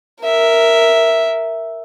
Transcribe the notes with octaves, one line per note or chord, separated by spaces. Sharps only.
A#4 E5